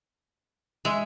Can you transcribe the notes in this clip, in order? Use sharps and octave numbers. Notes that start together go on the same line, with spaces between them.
G#3 E5